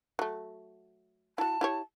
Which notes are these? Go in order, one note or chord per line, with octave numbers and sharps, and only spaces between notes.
F#3 A3
E4 F#4 A5
E4 G4 C#5